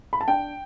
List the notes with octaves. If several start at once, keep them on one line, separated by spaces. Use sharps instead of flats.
B5
A5
D4 G5